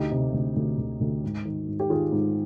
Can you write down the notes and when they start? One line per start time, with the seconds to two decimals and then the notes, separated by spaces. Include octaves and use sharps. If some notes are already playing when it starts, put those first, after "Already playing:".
Already playing: D2 D#4 G4
0.11 C3
0.33 D2
0.56 D2
0.78 D2
1.00 D2
1.23 G#2
1.45 D#3
1.68 G#2
1.80 G4
1.90 D#3 F4 G#4
2.12 G#2